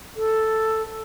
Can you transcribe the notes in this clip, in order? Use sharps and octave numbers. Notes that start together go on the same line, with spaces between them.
A4